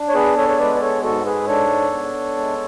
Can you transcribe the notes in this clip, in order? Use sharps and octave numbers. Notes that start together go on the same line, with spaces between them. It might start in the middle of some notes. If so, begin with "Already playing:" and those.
Already playing: D4
C#5
B3 G#4 B4
A4 C#5
C#5
G#3 B4 D5
D5
A4 C#5
G#2 F#4 A4
G#4 B4
D4 A4 C#5
B3
G#3